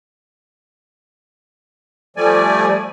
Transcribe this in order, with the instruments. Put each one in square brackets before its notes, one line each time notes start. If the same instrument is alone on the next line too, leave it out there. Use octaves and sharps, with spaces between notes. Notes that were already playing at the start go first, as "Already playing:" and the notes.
[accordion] F3 G3 A3 D5 G#5